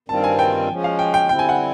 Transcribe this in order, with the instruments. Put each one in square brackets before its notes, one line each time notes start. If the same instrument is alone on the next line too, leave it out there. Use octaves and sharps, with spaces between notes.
[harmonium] G2 D#3 G3 C4 F4 [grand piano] A5
[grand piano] G#5
G5
[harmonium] F3 G#3 C#4
[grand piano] F5
G5
G5
[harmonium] D3 G3 C4 E4 [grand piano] G5
[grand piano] G#5
F#5